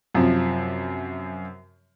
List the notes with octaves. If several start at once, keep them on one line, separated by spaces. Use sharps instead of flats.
F#2 C3 F3